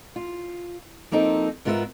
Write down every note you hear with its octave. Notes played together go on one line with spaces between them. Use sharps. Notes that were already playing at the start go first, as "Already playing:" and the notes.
F4
F3 A#3 C4 D#4 A4
G#2 B3 F4 A#4 B4 E5